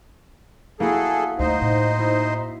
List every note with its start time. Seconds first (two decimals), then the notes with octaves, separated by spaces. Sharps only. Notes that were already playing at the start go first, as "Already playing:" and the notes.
0.80 A#3 E4 F#4 G#4 A4
1.39 D2 A3 D#4 C5
1.62 A2
1.99 E4